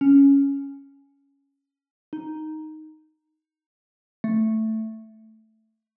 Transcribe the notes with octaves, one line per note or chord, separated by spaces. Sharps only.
C#4
D#4
A3